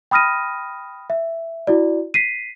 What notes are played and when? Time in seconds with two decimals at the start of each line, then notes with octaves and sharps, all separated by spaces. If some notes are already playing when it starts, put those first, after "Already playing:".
0.11 G5 B5 D#6 F6 A#6 D#7
1.10 E5
1.67 E4 F#4 D5
2.14 B6 C7 D#7